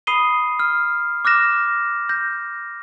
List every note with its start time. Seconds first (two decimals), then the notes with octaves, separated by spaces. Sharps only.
0.07 B5 D#6 C7 D#7 G7
0.59 F6
1.25 D6 F6 F#6 A#6 E7
2.09 G6 A#6